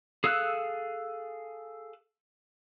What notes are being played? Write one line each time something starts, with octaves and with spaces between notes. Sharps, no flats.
G#4 A4 F5 E6 F#6